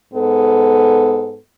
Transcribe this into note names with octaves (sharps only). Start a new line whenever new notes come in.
G#2 B3 A4